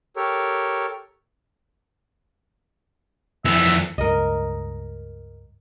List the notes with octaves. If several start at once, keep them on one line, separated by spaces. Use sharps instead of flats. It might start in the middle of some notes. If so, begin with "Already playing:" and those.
G4 A4 A#4 C#5
F2 E3 E5
C#2 G2 A#4 D#5